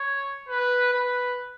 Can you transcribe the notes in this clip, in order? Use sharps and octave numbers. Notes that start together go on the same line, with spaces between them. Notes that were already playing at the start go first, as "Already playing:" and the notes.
Already playing: C#5
B4
B4